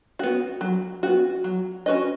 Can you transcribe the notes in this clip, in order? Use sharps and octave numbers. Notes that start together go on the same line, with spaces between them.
B3 F#4
F#3
B3 F#4
F#3
C#4 F#4 B4 D#5